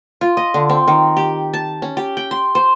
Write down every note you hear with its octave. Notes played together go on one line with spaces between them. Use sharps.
F4
D#5
D3
C4
D#3
G4
A5
C#4
G4
G5
C6
C5